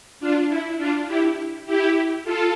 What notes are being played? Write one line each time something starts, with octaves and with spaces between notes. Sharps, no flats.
D4 F4
E4
D4 F4
E4 G4
E4 G4
F4 A4